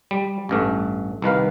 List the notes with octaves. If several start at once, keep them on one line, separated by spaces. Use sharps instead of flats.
G3
A1 G2 A3
C2 D#3 B4 F5